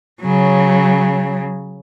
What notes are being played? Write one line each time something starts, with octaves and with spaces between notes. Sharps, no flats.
C#3 F#3